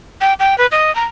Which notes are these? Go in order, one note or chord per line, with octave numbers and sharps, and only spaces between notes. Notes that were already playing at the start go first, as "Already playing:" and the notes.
G5
G5
B4
D#5
A#5